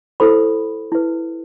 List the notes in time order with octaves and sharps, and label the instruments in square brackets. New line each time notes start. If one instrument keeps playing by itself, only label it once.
[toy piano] E4 A4 C5 B5
E4 B4